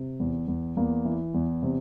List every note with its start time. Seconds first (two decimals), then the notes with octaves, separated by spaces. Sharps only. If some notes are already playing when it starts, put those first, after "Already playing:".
Already playing: C3
0.20 E2
0.48 E2
0.77 E2 A#3
1.05 E3
1.34 E2
1.62 C3